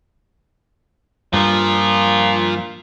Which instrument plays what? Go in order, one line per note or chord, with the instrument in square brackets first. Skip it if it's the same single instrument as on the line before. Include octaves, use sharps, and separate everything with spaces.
[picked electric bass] G2 [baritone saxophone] A#2 [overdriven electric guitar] F3